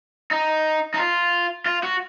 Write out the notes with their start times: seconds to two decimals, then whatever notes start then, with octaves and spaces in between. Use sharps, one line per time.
0.31 D#4
0.94 D#4
0.98 F4
1.66 F4
1.83 F#4